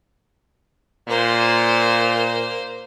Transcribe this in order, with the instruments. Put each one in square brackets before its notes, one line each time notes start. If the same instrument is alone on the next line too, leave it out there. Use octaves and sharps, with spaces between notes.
[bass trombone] A#2 [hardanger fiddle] A#3 C5